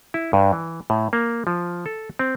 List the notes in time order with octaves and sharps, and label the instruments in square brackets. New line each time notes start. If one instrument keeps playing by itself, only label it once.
[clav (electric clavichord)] E4
G2
E3
A2
A#3
F3
A4
C4